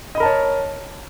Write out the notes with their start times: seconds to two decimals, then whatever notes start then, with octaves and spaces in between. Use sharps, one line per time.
0.15 D#5
0.18 B5
0.20 A#4
0.23 A5
0.25 C#5